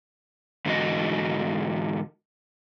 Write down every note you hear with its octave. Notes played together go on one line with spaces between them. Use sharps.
G#2 D3 E3 C4 F#4 D#5